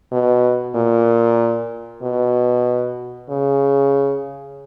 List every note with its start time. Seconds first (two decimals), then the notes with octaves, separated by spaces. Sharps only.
0.12 B2
0.75 A#2
2.02 B2
3.29 C#3